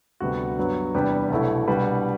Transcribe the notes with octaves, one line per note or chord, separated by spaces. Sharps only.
D2 C3 G3 B3 F#4
G2 F#3 B3
E2 C3 G3 B3 D4 G4
C2 B2 F#3 A3 E4
C2 B2 G3 D4 B4